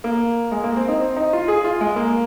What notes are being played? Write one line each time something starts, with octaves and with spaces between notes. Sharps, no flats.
A#3
G#3
A#3
C4
D#4
C4
D#4
F4
G#4
F4
G#3
A#3